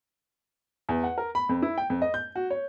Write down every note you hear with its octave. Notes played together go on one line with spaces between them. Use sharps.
E2
F#5
A#4
B5
F2
E4
G5
F2
D#5
G6
F#4
C#5